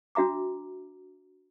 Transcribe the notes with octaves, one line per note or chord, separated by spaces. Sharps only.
D4 F#4 E5 A#5 D6